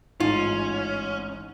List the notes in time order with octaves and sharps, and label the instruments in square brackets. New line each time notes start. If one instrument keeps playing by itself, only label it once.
[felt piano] A1 G#2 [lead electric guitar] C#4 [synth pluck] D#4 [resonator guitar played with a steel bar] F4